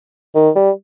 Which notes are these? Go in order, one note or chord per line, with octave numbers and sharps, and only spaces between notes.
D#3
G3